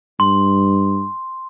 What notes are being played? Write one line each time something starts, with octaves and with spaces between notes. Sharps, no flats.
G2 C6